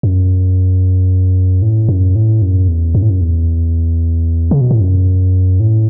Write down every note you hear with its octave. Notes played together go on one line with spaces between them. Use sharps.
F#2
A2
F#2
A2
F#2
E2
F#2
A2
F#2
E2
C#3
B2
A2
F#2
A2